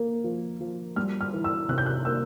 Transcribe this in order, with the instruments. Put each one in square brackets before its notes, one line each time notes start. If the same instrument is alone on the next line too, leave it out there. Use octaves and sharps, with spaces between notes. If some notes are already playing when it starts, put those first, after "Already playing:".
Already playing: [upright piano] A#3
F3
F3
G3 F6
F6
E3
E6
C3 F#6
G6
F#6
A#3 E6